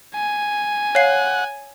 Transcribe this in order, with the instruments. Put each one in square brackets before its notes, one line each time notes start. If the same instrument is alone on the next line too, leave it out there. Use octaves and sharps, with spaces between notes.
[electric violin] G#5
[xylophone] C#5 F5 C7 [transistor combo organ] F#5